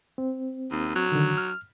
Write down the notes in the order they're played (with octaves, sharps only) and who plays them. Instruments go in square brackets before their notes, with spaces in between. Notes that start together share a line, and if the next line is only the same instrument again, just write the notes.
[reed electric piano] C4
[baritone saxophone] D#2
F#3
[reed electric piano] D3 D#3
F6